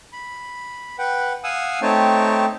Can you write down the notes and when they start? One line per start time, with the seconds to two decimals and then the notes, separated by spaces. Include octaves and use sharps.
0.13 B5
0.99 B4 F#5 G5
1.44 F5 F#5 G#5 D#6 E6
1.82 A3 C4 D#4 C#5 G5 A5